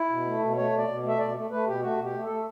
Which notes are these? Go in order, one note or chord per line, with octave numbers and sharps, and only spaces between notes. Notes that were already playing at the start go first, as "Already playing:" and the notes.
Already playing: E4
B2
A3
B2
A3 C#5
B2
D5
B2
A3
E5
B2 D5
A3
A3 B4
B2 G4
A3 F#4
B2
G4
A3
A4
A3